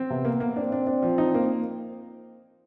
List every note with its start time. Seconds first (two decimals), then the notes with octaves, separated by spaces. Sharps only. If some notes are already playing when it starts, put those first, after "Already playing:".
Already playing: C4
0.09 C3 B3
0.25 A#3
0.40 A#3
0.56 C4 D4
0.72 D4
0.87 D4
1.02 F3
1.18 D#4
1.34 A#3